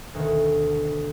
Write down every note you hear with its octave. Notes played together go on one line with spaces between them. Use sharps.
D2 B2 D#3